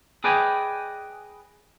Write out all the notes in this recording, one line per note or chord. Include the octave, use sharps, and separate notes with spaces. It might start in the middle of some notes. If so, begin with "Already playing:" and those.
G#4 B4 D5 D#5 G5 G#5